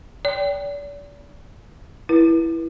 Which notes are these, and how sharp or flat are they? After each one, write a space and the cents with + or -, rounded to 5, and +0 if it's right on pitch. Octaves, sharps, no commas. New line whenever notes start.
D5 -40 G5 +5
E4 +5 B4 -35